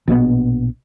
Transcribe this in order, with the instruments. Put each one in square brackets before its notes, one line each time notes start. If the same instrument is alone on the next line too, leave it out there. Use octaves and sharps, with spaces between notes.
[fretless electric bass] A#1 B2 E3 B3